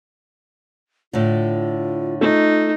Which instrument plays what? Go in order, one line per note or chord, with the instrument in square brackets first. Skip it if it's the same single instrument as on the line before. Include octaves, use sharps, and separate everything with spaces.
[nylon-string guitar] A2 D3 [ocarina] F4
[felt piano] A3 [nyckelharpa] D#4 [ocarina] F4